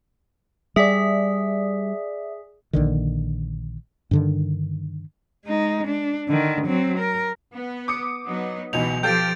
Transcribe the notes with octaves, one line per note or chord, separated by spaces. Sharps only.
G3 G#4 D5 E5 B6
A#1 D3 D#3
G2 D3 D#3
G#3 D#4
D4
D3 D#3
F#3 C4
A#4
B3
D6 D#6 C#7
F#3 B3 D#4
C#2 B2 E3 D#4 G#5 F7
F3 G4 A4 F5 G5 G6 A6 D7